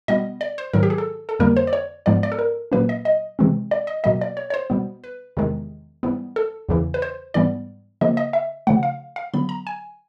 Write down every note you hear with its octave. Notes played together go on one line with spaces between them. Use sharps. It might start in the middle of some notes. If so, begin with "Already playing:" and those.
B2 G3 B3 D#5
D5
C5
G#2 D#3 F#3 A#4
G4
G#4
A4
A4
F2 D3 G3 A#3 A#4
C5
D5
C#5
G#2 F3 G#3 B3 D5
D5
A4
A#4
A#2 F#3 A#3 C#4 B4
D#5
D#5
C3 E3 G#3 C4
D5
D#5
B2 F#3 A#3 D#5
D5
C#5
C#5
C5
B2 G3 B3
B4
E2 C3 D#3 G#3
G#2 E3 G3 B3
A4
E2 C#3 E3
B4
C5
G#2 E3 G3 B3 D5
C#3 F3 A#3 D#5
D#5
E5
C#3 F3 A3 F#5
F5
F5
D3 F#3 B3 B5
A#5
G#5